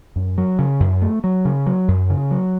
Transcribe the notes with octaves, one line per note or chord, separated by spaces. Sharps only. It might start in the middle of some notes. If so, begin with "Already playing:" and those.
F#2
F#3
C#3
F#2
A3
F#3
C#3
F#3
F#2
C#3
F#3